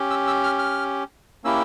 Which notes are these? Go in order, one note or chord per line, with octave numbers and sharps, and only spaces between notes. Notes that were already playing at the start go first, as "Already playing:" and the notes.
Already playing: C#4 G4
E6
E6
F6
F6
A#3 C#4 E4 G4 E6